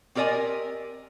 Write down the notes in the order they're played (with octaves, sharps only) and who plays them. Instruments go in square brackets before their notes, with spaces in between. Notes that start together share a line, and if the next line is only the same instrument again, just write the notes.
[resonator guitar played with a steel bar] C4 G4 A#4 D5 D#5 G#5